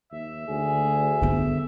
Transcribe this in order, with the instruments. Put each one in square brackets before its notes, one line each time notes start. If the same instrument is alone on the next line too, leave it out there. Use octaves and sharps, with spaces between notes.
[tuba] D#2 [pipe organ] E5
[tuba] D2 [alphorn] G#4
[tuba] D3 [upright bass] B3 E4